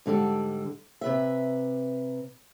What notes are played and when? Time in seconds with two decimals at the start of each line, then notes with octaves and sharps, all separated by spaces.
0.06 G#2 D3 G3 A4
1.01 C3 B4 E5